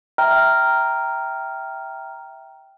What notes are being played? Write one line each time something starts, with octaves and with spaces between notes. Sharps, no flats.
E5 G5 A#5 F6